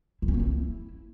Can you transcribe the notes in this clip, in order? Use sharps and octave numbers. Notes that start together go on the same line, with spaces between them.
E4
C#4
A#3
E4